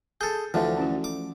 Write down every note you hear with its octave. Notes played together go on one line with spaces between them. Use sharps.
G#4 A4 G6
D2 D3 E3 F3 A3 A4 C5 D5
C#4 E4 F#4
D6